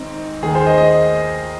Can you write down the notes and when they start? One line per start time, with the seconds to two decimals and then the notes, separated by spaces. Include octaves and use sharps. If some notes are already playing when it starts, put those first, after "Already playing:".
Already playing: G#1 G#2 C4 D#4
0.43 D#2 D#3 G#4
0.55 C5
0.67 D#5
0.78 D#5